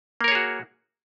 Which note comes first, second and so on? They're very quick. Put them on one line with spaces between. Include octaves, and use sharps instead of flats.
A#3 A#4 C#5 G#4 F#4